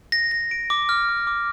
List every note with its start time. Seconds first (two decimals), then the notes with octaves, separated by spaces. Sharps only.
0.12 A#6
0.31 A#6
0.51 D7
0.70 D6
0.89 F6
1.09 D6
1.27 D6